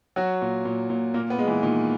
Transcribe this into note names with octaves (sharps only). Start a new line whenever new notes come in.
F#3 F#4
A#2
A#2
A#2
A#2 A#3
B3
G#3
E3
A#2 D#3